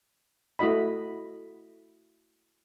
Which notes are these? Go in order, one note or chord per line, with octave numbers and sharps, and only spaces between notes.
A3 E4 F#4 D#5 B5